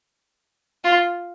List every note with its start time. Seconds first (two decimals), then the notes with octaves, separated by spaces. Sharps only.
0.84 F4